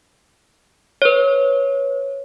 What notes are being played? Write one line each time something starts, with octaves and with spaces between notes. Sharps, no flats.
B4 C#5